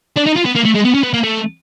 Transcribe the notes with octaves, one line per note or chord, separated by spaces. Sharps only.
D4
D#4
F4
B3
A#3
A3
G#3
B3
C#4
B3
A#3
A3